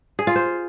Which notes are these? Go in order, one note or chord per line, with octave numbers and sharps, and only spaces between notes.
G#4
F4
C5